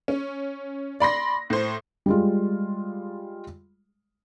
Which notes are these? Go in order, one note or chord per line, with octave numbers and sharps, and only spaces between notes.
C#4
D5 B5 C6 A#6
A2 C5
G3 G#3 F4